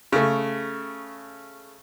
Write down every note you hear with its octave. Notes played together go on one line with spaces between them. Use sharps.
C#3 A3